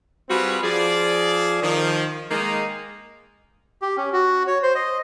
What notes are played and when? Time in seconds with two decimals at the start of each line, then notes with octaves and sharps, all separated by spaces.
0.29 G3 C4 F4 F#4 G#4 B4
0.63 F3 G#4 D5
1.62 D#3 F3
2.30 D#3 G#3 A#3 D#4
3.82 G4
3.97 C#4
4.13 F#4
4.47 C#5
4.63 C5
4.75 D#5